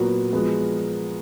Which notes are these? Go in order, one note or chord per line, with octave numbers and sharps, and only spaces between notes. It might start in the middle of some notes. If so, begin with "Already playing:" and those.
Already playing: A#2 F#3 B3 F#4 A#4
F3 G#3 B3